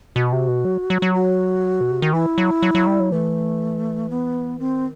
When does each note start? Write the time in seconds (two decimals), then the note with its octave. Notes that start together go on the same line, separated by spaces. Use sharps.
0.16 B2 F#4
0.33 C3
0.48 B2
0.65 F#3
0.90 F#3
1.02 F#3
1.14 F#4
1.81 B2
1.91 C3
2.02 D#3
2.13 E3 E4
2.38 F#3
2.62 F#3
2.75 F#3
2.87 G3
3.00 F#3
3.12 E3 A3
4.10 B3
4.59 D#3 C4